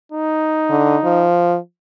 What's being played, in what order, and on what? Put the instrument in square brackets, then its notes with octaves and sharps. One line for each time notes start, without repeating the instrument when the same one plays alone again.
[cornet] D#4
[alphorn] D3
F3